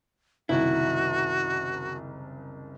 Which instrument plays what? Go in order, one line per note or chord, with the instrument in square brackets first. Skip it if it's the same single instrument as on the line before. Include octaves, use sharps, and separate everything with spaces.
[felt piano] F#1 C2 D#3 [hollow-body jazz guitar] E4 [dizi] F#4